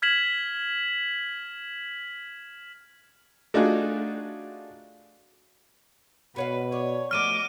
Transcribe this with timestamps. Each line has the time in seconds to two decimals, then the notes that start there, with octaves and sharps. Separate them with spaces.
0.02 F6 G#6 B6 E7 F#7
3.54 A3 D4 D#4 F4 F#4 G#4
6.36 B2 F#4 B4 C#5 F5
6.72 C#5 D5
7.11 F3 F#3 A3 D#5 D6 F6 D#7